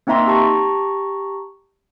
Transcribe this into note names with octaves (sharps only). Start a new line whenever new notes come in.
A#3 C4 D#4 E5 A#5 C6
G4 A5 A#5 C#6